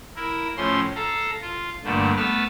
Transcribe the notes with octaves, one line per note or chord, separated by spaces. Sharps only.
E4 A#4
A2 F3 C#4 C6
A4 F5 A#5
F4
G2 A#2 D3 A3
A3 B3 B4 A5 F6